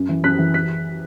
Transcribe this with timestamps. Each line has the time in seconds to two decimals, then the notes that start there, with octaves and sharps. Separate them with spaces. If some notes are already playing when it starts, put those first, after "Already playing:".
Already playing: F#2
0.09 E3
0.24 F#2 F#6 B6
0.39 E3
0.54 F#6 B6